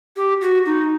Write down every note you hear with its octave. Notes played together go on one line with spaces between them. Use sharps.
G4
F#4
D#4